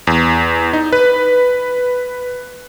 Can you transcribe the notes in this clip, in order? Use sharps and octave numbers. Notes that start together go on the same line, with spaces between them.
E2
D#4
B4